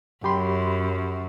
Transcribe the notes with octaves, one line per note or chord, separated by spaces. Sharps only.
F#2 G4 B5 C6